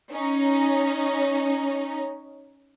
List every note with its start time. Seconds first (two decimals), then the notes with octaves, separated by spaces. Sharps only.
0.11 C#4 D#4